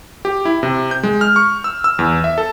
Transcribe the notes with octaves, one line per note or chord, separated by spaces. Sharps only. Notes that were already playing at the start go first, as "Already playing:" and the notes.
G4
E4
C3
G6
G#3
F6
C#6
E6
E6
E2
E5
A4